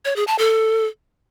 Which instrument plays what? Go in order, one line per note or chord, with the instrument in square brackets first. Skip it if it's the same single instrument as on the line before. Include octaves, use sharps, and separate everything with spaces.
[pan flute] C#5
G#4
A5
A4